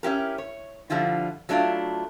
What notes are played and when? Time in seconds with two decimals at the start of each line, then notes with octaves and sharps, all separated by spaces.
0.03 C#4 E4 G4 A#4
0.38 C#5
0.90 D3 F3 G3 E4 F4
1.49 F#3 A3 D4 E4 F4